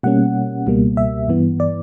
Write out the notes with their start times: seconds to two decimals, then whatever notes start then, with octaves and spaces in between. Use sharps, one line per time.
0.03 B2 G3 A#3 C#4 F#5
0.66 C#2 B2 G3 A#3
0.97 E5
1.28 G2 E3 B3
1.60 D5